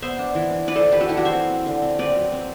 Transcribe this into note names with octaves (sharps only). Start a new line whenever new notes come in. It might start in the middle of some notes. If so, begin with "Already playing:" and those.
B3 C5 E5
D4
E3
D4
E3 B4 D5
A4 C5
E3
G4 B4
D4 F#4 A4
E4 G4
E3 F#4
C5 E5
C4
C4
D3
C4
C4 B4 D5
F#3
C4